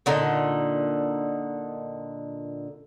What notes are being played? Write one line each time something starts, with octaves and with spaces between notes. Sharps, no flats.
A#2 D3 D#4